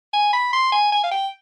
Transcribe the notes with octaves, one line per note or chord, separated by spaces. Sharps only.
G#5
B5
C6
G#5
G#5
F5
G5